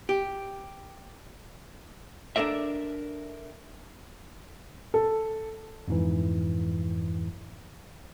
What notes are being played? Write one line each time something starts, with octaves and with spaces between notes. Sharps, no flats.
G4
D4 A4 A#4 D5 E5
A4
F2 G#2 E3